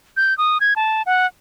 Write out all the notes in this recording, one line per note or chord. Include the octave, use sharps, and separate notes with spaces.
G6
D#6
G#6
A5
F#5